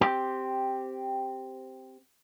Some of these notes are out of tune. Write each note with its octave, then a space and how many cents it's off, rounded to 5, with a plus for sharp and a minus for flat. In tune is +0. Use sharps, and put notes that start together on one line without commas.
C4 +0 G4 +0